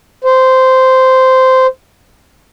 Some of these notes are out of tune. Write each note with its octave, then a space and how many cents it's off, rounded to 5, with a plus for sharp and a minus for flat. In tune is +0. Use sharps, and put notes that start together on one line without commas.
C5 -10